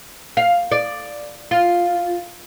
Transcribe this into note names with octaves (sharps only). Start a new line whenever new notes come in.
F5
D5
F4